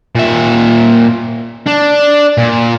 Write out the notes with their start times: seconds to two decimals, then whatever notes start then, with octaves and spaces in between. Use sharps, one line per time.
0.15 A#2 E5
1.66 D4
2.38 A#2